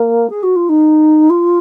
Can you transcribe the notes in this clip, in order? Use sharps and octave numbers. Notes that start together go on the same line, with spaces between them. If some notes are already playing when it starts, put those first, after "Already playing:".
Already playing: A#3
G#4
F#4
F4
D#4
F4